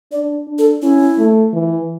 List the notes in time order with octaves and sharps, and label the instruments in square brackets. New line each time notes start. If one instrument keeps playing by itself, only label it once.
[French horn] D4 [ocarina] D5
[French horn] D4
[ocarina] A4
[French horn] C#4 [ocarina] E4
[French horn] A3
E3